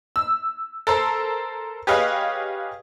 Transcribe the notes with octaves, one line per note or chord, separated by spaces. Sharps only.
E6
A4 A#4 C5
G4 G#4 B4 C#5 D#5 F5